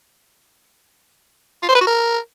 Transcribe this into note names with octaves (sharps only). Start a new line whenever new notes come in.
F4
C5
B4
F#4
A#4